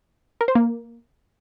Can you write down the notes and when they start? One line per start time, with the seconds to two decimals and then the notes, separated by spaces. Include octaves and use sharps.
0.41 A#4
0.48 C5
0.55 A#3